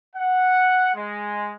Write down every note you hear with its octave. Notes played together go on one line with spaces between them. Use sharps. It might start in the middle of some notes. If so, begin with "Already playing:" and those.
F#5
G#3